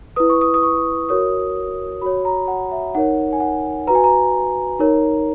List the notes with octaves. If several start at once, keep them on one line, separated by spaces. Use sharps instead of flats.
E4 B4 D#6
C#6
D#6
D#6
C#6
F#4 A#4 C#5 D#6
F#4 C#5 B5
A#5
F#5
E5
D#4 A#4 C#5 F#5
G#5
F#5
F#4 B4 A#5
G#5
A#5
D#4 A#4 C#5